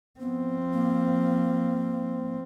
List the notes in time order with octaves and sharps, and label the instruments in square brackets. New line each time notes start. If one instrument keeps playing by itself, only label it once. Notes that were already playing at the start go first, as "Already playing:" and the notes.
[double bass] F3 C4 [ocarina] B3
[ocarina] A#3